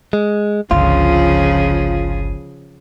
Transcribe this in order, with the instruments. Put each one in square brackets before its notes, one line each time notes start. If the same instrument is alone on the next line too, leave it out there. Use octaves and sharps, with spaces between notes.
[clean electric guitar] G#3
[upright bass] G1 C#2 [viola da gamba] C#3 F3 G#4 [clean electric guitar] F4